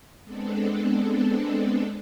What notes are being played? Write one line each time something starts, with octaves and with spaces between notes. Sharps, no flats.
G#3 B3 C4 D4 A4